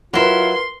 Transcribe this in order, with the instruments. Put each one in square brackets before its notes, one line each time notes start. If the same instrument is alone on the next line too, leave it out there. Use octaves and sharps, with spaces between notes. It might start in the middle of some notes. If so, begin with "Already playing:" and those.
[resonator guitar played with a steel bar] F#3 E4 [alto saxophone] F4 [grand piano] A#4 B4 [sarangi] C6